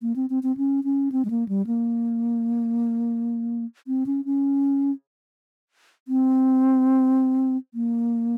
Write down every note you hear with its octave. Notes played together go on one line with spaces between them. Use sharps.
A#3
C4
C4
C4
C#4
C#4
C4
G#3
A#3
G3
A#3
C4
C#4
C#4
C4
A#3